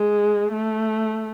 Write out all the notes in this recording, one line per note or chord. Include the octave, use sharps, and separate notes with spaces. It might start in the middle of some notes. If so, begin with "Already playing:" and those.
Already playing: G#3
A3